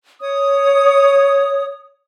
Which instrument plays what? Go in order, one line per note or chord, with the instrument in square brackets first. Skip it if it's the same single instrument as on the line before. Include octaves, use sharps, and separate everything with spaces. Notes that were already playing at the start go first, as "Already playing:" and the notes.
[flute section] C#5 D#6